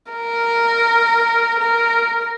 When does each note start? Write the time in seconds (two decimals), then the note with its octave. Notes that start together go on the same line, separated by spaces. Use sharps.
0.11 A#4
1.60 A#4